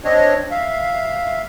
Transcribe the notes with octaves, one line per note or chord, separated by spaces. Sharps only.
C4 D4 C#5 D#5
E5 F5